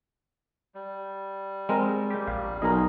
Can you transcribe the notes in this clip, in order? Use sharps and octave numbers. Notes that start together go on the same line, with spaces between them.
G3
G#3 C4 A#4
G4
A#1 F5
B1 G#4 A#4 D#5